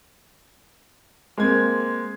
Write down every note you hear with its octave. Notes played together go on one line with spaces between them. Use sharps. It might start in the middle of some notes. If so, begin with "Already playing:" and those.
G#3 A#3 C4 G#6